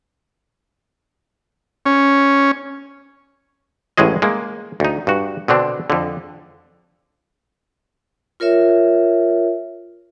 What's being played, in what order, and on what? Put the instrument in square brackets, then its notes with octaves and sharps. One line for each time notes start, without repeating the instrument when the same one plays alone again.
[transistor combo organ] C#4
[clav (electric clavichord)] A1 A2 G#3 G#4 D#5
G#3 A#3
D2 D#4
G2 F#4
B2 D3 C4 D4
F2 D3
[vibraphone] F4 A#4 C#5 E5